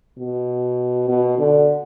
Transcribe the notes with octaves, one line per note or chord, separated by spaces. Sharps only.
B2
B2
D3